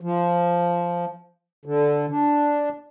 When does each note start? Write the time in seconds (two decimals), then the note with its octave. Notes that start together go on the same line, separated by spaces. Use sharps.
0.01 F3
1.66 D3
2.11 D4